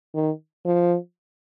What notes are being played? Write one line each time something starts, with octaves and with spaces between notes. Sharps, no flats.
D#3
F3